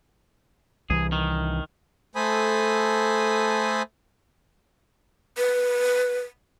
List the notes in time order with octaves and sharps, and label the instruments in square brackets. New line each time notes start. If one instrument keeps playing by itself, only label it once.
[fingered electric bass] C2 E3 [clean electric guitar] G#4
[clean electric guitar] D#3
[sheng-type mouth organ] A3 A4 C5 G#5 B5 D#6
[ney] B4